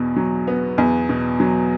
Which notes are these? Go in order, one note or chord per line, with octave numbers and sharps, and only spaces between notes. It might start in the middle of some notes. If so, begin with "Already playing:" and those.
Already playing: E2 B2
F#3
B3
E2
B2
F#3